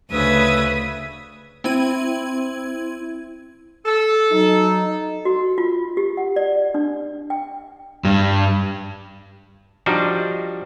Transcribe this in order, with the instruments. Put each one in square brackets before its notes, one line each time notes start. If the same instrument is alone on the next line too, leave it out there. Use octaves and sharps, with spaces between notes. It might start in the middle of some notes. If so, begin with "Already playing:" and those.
[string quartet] D2 C#3 B4 E5 D#6 G#6
[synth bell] C4 E4 G#6 D#7
[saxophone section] A4
[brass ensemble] F#3 D#4
[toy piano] F#4
F4
G4
F#5
D5
D4
G5
[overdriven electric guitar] G2
[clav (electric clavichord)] F3 G3 D4 D#4 F#4